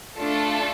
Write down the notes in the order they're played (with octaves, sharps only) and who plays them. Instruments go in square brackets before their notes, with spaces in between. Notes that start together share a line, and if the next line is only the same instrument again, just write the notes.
[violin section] A3 D4 F4 A4